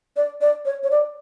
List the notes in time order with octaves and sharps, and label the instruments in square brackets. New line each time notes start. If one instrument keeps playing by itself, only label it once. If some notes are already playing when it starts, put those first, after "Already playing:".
[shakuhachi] D5
D5
C#5
C#5
D5